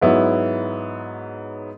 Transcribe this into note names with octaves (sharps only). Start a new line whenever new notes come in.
G#2 F#3 B3 E4